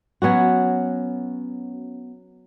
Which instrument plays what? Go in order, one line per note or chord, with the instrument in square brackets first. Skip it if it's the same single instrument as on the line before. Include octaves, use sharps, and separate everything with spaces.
[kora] F#3 B3 C#4 F#4